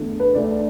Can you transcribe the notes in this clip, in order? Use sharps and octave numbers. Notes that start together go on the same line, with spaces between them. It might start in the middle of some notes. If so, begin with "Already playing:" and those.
Already playing: E2 D3 A3
B4
D2 D3 A3 D5